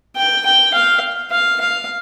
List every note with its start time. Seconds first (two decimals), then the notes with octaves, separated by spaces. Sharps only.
0.17 G5
0.45 G5
0.74 F5
1.31 F5
1.61 F5